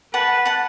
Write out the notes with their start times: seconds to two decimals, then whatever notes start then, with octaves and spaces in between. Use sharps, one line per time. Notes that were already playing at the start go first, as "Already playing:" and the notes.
0.14 B4 F#5 A5
0.45 F#5 A5